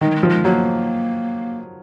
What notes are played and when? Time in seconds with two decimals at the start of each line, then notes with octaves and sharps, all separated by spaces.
0.01 D#3 G#3
0.11 F#3
0.15 G#3
0.23 F3
0.30 G#3
0.44 F#3 A#3